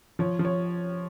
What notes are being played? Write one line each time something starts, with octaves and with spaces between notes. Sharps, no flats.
F3 C#5
F3
C#5